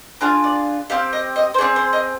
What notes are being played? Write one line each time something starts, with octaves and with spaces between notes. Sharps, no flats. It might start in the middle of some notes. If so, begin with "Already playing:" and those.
D4 F4 G#4 F5
D5
C4 G4 F5
D#5
D#5
C5
C4 D#4 G#4 D5
C5
D#5